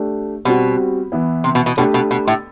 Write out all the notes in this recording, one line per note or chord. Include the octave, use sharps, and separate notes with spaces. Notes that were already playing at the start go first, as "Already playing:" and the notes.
Already playing: A3 D4 G4
B2 G3 C4 F#4
E3 B3 E4
C3
B2
B2
B2 A3 D4 G4 D5
B2
B2
A2